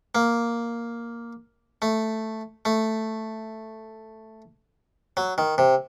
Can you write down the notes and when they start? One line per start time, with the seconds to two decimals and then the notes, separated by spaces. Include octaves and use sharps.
0.15 A#3
1.82 A3
2.65 A3
5.17 F#3
5.38 D#3
5.58 C3